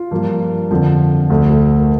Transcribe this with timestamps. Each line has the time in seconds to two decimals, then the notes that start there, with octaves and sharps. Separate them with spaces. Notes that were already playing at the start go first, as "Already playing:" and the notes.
Already playing: F4
0.11 G2 F3 A#3
0.71 F2 D3 F3
1.30 D2 D3 A3
1.50 A4
1.78 A#4